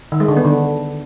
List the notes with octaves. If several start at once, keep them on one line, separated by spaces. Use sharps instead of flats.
D#3
G#3
D3
B3
D3